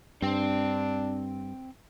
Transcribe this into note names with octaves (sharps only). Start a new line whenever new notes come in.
G2 C4 D4 G5